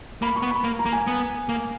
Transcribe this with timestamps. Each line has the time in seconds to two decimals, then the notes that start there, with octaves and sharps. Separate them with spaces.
0.22 A#3 B5
0.36 C#6
0.43 B3
0.51 B5
0.64 A#3
0.79 A#5
0.86 A#3
0.92 G#5
1.07 B3
1.49 A#3